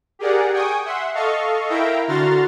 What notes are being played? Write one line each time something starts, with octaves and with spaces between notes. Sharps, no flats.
G4 G#4 A#4 D5 F#5
G5 G#5 C#6 D#6
E5 F#5 C6
A4 D#5 F5 C#6
E4 A#4 E5 F5 G5 A#5
D3 F#4 A#5 C6 F6 A6